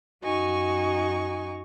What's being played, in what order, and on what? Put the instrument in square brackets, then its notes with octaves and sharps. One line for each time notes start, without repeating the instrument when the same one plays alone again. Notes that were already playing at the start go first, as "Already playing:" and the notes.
[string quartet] F#2 D#4 F#4 G#5 C#6